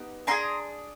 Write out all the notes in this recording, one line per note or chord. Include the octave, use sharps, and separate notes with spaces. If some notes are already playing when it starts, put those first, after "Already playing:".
Already playing: B3 D#4 G4
D4 F4 G#4 A#5 C6